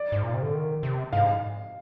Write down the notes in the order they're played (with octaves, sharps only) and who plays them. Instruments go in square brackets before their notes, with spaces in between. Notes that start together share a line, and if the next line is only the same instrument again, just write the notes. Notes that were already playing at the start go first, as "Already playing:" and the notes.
Already playing: [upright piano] D5
[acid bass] G#2
A#2
C3
D3
D#3
C3
[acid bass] G#2 [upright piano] F5